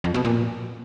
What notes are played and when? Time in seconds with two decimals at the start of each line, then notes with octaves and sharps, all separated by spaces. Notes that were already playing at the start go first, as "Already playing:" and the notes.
0.04 F2
0.14 B2
0.25 A#2